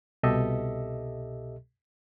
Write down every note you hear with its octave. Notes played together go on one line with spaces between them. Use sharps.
C2 B2 G4 A4 D#5 E5